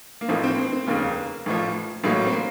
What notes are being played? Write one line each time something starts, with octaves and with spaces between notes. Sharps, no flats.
A#3
A1 A2 F3 C4
C4
C4
C4
F1 D#2 C#3 A#3
A1 A2 F3
A1 A2 F#3 A#3
C4
A#3